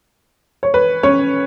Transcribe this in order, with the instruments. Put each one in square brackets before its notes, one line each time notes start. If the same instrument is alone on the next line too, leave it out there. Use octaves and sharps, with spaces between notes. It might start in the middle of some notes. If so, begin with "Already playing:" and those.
[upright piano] C#5
B4
C#4 C#5